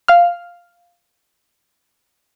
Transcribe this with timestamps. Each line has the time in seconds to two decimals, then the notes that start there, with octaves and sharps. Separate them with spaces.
0.08 F5 F6